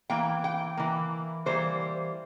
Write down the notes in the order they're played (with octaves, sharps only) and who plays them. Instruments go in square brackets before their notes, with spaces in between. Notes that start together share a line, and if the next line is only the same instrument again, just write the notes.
[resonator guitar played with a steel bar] E3 A#3 G5
G5
E3 A#3
E3 G3 A#3 C5